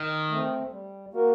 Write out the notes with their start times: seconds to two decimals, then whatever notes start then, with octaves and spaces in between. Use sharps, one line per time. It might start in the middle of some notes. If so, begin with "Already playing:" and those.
Already playing: D#3
0.30 A3 C4
0.72 G3
1.13 A#3 F#4 A#4